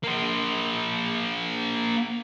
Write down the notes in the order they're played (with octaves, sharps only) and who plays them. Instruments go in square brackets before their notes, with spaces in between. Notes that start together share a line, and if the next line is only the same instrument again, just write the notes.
[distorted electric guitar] A#3 C5